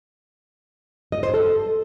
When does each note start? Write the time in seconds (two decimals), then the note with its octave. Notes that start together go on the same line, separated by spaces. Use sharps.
1.12 D#5
1.23 C5
1.34 A4